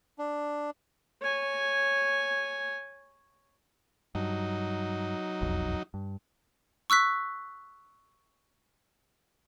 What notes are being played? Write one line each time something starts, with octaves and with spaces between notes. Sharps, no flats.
D4
C#5 G#5
G2 F#3 D#4
E1 B1 F2
G2
C#6 E6 F#6 B6